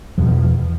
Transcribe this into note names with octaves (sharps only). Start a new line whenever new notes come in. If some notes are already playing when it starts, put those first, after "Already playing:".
E2 B2 F3